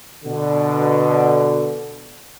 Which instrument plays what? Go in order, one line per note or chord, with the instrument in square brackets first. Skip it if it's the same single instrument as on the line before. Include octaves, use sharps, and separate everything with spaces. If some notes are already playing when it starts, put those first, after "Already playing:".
[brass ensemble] B2 D3